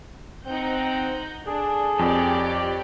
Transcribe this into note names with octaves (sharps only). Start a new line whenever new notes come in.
C4 D#4 F#5 G6
D4 G#4 A4
F2 G4 C#5 D5